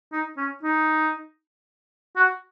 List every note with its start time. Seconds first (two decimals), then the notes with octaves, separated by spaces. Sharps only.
0.12 D#4
0.37 C#4
0.63 D#4
2.16 F#4